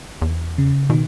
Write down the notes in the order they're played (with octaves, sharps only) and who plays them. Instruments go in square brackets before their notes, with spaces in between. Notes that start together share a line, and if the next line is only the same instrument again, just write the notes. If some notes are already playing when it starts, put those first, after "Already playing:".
[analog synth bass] E2
[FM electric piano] C#3
[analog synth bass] B2 [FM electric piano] D#3